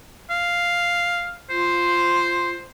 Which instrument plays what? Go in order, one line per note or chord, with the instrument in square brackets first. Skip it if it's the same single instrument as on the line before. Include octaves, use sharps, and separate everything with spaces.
[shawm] F5
[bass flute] F4 [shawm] C5